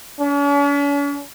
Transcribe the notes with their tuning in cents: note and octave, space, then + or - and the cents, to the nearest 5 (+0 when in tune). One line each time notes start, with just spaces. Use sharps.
C#4 +45